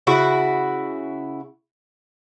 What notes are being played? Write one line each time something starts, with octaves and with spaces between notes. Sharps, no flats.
C#3 E4 F#4